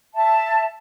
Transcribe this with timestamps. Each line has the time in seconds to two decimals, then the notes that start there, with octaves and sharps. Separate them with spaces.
0.15 E5 A5